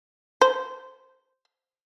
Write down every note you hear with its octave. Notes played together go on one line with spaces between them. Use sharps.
C5